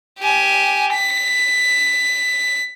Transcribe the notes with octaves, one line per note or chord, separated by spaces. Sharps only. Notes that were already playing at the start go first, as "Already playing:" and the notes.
G4 G#5
B6